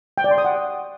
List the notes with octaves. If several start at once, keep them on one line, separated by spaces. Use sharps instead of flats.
G5
D5
C6
D#6
F#5